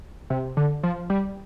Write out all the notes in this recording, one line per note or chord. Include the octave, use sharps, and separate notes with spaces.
C3
D3
F3
G3